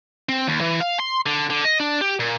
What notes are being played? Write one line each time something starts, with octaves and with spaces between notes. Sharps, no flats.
C4
D#2
E3
F5
C6
D3
D3
D#5
D4
G4
A#2